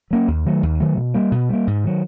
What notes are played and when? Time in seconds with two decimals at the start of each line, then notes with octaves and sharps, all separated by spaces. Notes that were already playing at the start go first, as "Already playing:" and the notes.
0.11 F#3 A#3 C#4
0.28 D#2
0.46 D#3 F#3 A3
0.63 D#2
0.80 D#3 F#3 A3
0.97 B2
1.14 G3 A#3
1.32 B2
1.49 G3 A#3
1.67 G#2
1.84 D#3 F#3